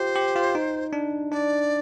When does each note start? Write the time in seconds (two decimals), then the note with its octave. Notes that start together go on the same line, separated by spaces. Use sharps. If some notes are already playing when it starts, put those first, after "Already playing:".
Already playing: F4 G4 C5
0.15 G4
0.36 F4
0.55 D#4
0.93 D4
1.32 D4 D5